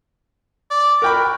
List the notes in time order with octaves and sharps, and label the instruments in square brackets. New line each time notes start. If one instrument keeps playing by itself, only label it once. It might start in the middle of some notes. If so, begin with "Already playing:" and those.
[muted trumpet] D5
[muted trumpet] F#4 [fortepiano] A#4 G5 B5